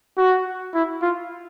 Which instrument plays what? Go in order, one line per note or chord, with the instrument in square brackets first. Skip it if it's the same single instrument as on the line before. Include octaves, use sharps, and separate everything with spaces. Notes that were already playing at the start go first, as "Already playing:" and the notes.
[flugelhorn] F#4
E4
F4